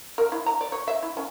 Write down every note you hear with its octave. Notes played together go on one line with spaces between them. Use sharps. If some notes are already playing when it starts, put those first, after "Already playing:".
A#4
E4
A#5
D5
C#5
E5
E4
C#4